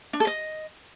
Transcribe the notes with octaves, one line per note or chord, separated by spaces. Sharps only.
D4
A4
D#5